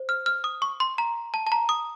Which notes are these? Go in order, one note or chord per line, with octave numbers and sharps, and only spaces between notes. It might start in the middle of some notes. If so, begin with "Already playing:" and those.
Already playing: C5
F6
F6
D#6
C#6
C6
A#5
A5
A5
A#5
D#6